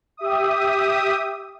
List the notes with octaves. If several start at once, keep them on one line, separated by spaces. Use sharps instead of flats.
G4 E5 D#6